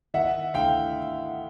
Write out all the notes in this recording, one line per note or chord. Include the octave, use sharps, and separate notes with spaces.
D#3 E5 F#5
D2 F5 G5